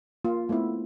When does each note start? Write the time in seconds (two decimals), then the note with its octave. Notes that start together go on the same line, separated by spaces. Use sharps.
0.24 A#3 F4
0.49 A3 B3 C4 E4